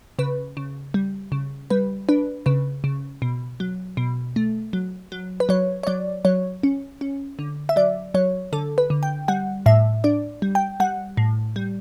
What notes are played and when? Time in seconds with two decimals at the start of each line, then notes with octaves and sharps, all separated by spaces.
0.19 C#3 B4
0.57 C#3
0.94 G3
1.32 C#3
1.70 G3 B4
2.09 D4 B4
2.46 C#3 B4
2.84 C#3
3.22 B2
3.60 F#3
3.97 B2
4.36 A3
4.73 F#3
5.12 F#3
5.40 B4
5.49 F#3 C#5
5.83 C#5
5.87 F#3 D5
6.25 F#3 C#5
6.63 C#4
7.01 C#4
7.39 D3
7.69 E5
7.76 F#3 D5
8.14 F#3 C#5
8.53 D3 A4
8.78 B4
8.90 D3
9.03 G5
9.28 G3 F#5
9.66 A2 E5
10.04 D4 D5
10.42 G3
10.55 G5
10.80 G3 F#5
11.17 A2
11.56 G3